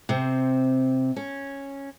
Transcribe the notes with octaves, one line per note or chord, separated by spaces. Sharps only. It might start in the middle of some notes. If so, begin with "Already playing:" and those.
C3 C4
C#4